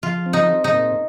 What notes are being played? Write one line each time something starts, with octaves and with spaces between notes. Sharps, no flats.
F3 F4
C4
D#4
C4
D#4
A#2